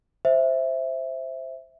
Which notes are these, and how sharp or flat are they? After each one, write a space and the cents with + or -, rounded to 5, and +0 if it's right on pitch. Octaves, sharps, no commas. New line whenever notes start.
C5 +0 E5 +0